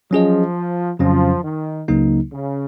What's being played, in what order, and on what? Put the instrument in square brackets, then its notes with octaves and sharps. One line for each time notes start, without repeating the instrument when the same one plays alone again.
[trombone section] F3 [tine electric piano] F#3 C#4 G#4 D#5
[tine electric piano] F2 C#3 F#3 C#4 [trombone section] F3
[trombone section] D#3
[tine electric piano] C#2 C#3 F#3 A#3 D#4
[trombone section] C#3